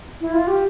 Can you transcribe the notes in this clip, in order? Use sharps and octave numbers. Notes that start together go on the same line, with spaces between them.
E4
F4
G4